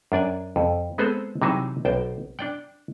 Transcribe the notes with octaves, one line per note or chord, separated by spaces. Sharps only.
F#2 D4 D5 G#5
F2
G#3 B3 C4 G#4 A4 C5
C3 E3 F#3 D#4 G#4 E5
B1 C5 G5
D4 D5 G5